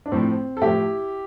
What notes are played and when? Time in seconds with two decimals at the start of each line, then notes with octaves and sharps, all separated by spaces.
0.06 D4
0.12 A2 F3 C4
0.57 A4
0.61 A2 F3 E4 G4